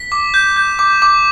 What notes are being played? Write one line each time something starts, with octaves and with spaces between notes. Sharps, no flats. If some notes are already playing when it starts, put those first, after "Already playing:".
Already playing: B6
D6
G6
G6
D6
D6